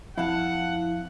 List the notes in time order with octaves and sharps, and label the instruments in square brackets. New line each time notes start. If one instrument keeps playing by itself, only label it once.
[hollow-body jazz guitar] F2 [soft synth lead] E4 [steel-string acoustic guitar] F5 A5 [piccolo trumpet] F#5